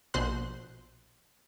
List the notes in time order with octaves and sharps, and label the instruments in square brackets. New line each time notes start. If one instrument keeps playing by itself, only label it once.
[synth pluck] A#1 B2 C5 C6 F#6